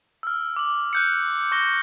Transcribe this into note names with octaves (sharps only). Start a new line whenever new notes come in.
E6 F6
D6 F#7
F#6 G6 C#7
C#6 F#6 A#6 G7